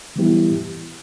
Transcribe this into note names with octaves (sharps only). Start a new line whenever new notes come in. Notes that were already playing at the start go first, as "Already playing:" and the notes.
E3 G3 B3 E4 G4